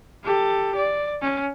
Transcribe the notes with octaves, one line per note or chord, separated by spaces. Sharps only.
G4 A4
D5
C#4